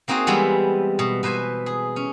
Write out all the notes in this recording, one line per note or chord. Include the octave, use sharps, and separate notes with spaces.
A#3 C4 D#4 F#4 G#4
E3 G3 G#3 B3 C4 E4
B2
B2 B4 C5 E5 G#5
G#4
C#4